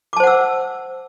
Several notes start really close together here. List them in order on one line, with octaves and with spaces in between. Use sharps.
D6 A5 C5 F#5 E6